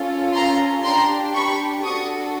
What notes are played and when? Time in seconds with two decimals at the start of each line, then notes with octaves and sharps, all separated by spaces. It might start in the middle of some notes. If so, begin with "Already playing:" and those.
Already playing: C#4 F4 A4
0.35 A#5 C6
0.84 D4 G4 A#5 C6
1.34 B5 C#6
1.84 D4 F#4 A4 C#6 D#6